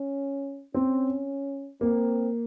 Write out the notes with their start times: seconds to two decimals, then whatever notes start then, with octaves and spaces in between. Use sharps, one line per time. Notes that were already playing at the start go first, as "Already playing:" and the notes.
Already playing: C#4
0.74 C4 C#4
1.81 A#3 C4